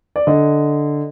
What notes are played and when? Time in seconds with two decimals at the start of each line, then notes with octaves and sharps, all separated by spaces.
0.16 D5
0.27 D3 D#5